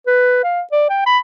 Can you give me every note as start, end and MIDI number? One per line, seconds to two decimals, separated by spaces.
0.07 0.44 71
0.44 0.61 77
0.72 0.88 74
0.90 1.04 79
1.06 1.18 83